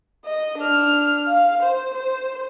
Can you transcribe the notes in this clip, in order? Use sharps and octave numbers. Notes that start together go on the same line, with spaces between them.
D#5
D4 F6
F5
C5
C5